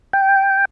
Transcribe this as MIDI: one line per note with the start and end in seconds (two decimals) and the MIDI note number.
0.13 0.65 79